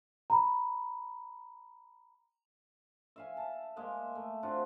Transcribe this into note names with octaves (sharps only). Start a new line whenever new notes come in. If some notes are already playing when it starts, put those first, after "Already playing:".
A#5 B5
E5 F5 G#5
A5
G#3 A#3 D#5 E5
A3
C4 D4 F4 F#4